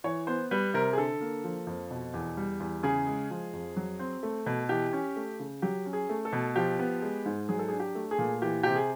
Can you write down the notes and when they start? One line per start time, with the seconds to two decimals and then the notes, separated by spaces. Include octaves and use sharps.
0.04 E3 C#5
0.27 B3 C5
0.51 G3 B4
0.74 C3 A#4
0.93 G#4
0.97 D3 A4
1.21 A#3
1.44 F3
1.67 F2
1.91 B2
2.14 E2
2.37 G3
2.60 E2
2.83 C#3 G#4
3.07 G#3
3.30 F3
3.53 F2
3.77 F#3
3.99 C4
4.23 A3
4.46 B2
4.69 E3 G4
4.93 C#4
5.16 A3
5.40 C#3
5.62 F#3 G4
5.86 C#4
5.93 G#4
6.09 A3
6.25 A4
6.33 B2
6.56 F3 G4
6.79 B3
7.02 G#3
7.26 G#2
7.49 F#3 G#4
7.59 A4
7.68 G#4
7.72 D4
7.80 G4
7.95 A3
8.11 G#4
8.19 A#2
8.42 E3 G4
8.63 C3 G4
8.76 G#4